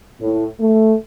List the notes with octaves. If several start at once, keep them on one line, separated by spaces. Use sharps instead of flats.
A2
A3